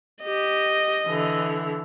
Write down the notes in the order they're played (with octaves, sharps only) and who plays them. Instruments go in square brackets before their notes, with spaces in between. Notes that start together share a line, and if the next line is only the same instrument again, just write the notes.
[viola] G4 [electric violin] D#5
[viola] D3 E3